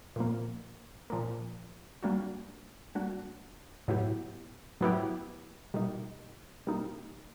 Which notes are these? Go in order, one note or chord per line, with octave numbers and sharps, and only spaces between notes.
A#2 F3 A#3
A#2 F3 A#3
G3 A#3 D4 F#4
G3 A#3 D4 F#4
A2 F#3 B3 E4 G4
A2 F#3 B3 E4 G4
B2 G3 A#3 D#4
B2 G3 A#3 D#4